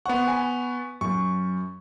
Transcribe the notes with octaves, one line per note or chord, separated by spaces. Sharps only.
B3 C5 F#5 C#6
G#5 B5
F#2 C#6